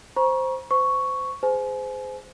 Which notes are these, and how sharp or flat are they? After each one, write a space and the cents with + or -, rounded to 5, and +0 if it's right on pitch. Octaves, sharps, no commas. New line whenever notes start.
C5 +0 A#5 +35 C#6 +0
C5 -30 C#6 +5
G#4 +0 C5 -30 G#5 +35